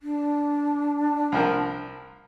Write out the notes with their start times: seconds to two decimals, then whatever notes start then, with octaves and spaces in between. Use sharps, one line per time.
0.03 D4
1.32 C2 F3 A#4